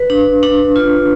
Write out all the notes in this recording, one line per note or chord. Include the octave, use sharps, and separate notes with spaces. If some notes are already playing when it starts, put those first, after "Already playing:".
Already playing: B4
D4
D4
F4